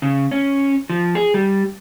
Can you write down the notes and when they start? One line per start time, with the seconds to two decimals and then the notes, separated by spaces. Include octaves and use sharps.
0.02 C#3
0.31 C#4
0.90 F3
1.15 G#4
1.34 G3